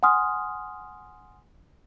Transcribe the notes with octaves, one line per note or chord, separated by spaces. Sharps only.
F#5 G#5 C6 D#6 F6